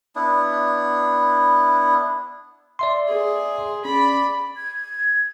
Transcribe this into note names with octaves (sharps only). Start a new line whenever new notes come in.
B3 D4 E4
D5 E5 C6
G#4
C#4 D5 B5
G#6